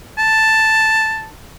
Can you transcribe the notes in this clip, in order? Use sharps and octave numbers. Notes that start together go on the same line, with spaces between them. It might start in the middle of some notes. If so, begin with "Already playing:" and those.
A5